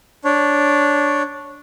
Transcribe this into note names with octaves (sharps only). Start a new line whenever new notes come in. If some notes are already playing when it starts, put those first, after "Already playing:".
D4 C#5